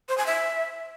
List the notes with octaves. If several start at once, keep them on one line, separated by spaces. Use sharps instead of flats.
C5
G#5
E5